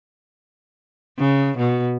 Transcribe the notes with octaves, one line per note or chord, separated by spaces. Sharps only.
C#3
B2